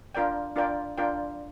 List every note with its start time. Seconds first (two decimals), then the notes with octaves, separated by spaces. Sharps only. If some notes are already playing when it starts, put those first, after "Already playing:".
0.15 D4 F4 A#4 D5 G5
0.56 D4 F4 A#4 D5 G5
0.98 D4 F4 A#4 D5 G5